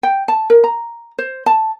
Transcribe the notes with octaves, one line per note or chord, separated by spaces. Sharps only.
G5
A5
A#4
A#5
C5
A5